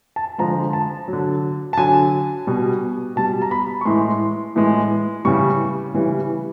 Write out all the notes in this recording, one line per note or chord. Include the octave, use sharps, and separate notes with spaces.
A5
D3 F3 G#3 A#5
A5
F#3
D3
A5
D3 F#3 G#5
B2 G3
B2 G3 A5
A#5
B5
C#6
A2 E3 G#3 C6
A2 E3 G#3
C#3 E3 G3 C#6
C#3 E3 G3